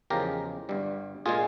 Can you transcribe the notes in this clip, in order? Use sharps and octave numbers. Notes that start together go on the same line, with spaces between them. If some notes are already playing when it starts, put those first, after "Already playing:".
E2 C#3 F3 G#3 G4 A#4
G1 G2 G3
A#2 G#3 F4 G#4